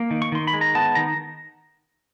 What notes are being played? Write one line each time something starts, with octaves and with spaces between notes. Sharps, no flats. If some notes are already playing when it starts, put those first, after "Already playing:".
Already playing: A#3
D#3
C#6
D#3 C6
B5
G#3
A#5
B3 A5
D#3 A#5